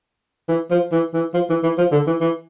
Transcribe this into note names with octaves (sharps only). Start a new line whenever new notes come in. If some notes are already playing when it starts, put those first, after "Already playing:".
E3
F3
E3
E3
F3
E3
E3
F3
D3
E3
E3